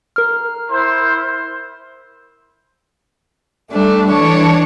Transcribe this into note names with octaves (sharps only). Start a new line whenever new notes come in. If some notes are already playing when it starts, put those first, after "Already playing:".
A#4 F6
E4 C5
G3 A3 D4
E3 D4 C#5